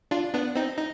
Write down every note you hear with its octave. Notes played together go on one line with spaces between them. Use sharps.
D4 F4
B3 D4
C4 D#4
D#4